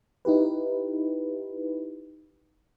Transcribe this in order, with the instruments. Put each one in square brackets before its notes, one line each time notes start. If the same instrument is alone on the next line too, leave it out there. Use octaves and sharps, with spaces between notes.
[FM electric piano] D#4 E4 G4 B4